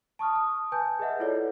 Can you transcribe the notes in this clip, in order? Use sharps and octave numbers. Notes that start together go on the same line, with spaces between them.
A5 C#6 D#6 F6
D#6
B4 G#5 A5 G6
G#4 B4 D#5 E5 F#5
E4 F4 A4 B4 C#5 D5